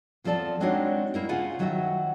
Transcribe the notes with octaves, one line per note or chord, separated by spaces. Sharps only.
E2 F3 C4 A4 D5 A5
G#3 C4 D4 D#4 F#4 C#5
A#3 E4 A#4
C#3 F4 G#4 F5 F#5 G#5
D#3 F#3 F#4 D#5 E5 F#5